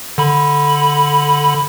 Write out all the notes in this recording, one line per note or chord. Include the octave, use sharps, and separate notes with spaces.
D3 B5